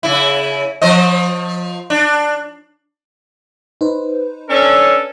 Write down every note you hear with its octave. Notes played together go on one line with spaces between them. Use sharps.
C#3 E4
F3 C5 D#5
D4
D#4 B4 C5
C#4 D4 A4